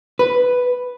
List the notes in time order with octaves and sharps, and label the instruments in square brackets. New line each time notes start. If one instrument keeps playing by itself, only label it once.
[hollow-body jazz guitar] B4